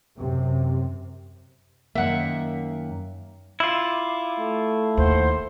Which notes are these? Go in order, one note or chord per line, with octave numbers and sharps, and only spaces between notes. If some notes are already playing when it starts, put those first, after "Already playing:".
F#2 C3
F#2 D#3 A#3 E5 F#5
E4 F4 D6
A3
D#2 C5 F#5 C6